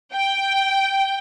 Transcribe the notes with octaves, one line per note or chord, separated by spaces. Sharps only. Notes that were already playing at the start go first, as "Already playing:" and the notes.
G5